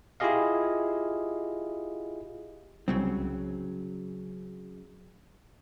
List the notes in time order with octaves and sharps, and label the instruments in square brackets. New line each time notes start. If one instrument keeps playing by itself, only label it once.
[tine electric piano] E4 F4 G4 G#4 D#5 F5
[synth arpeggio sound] C2 [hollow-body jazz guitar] C#3 F#3 C4